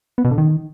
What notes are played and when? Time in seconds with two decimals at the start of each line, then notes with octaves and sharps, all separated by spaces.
0.18 B3
0.25 B2
0.31 D3
0.38 D#3